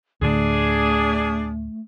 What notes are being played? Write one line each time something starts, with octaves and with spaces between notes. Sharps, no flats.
D2 A2 D3 A3 D4 G#4